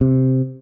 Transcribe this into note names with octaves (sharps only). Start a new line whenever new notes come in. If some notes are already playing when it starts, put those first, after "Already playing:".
C3